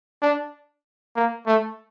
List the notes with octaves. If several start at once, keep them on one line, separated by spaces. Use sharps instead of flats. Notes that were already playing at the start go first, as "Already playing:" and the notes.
D4
A#3
A3